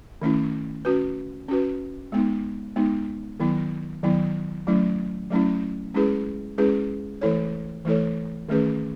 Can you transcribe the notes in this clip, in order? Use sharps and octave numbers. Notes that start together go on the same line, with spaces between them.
D#3 A3 C#4 E4
C#4 F#4 B4
C#4 F#4 B4
G#3 B3 D#4
G#3 B3 D#4
D#3 F#3 B3 E4
D#3 F#3 B3 E4
F#3 A3 C#4 E4
F#3 A3 C#4 E4
G#3 C#4 E4 G#4 B4
G#3 C#4 E4 G#4 B4
E3 A3 E4 A4 C#5
E3 A3 E4 A4 C#5
D#3 A3 C#4 G#4 B4